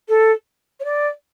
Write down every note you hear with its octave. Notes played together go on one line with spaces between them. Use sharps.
A4
C#5
D5